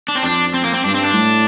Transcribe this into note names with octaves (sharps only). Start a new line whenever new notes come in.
D4
C4
F2 D4
C4
A#3
C4
G2 D4
C4
D4
A2